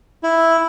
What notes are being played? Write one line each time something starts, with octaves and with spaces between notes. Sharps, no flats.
E4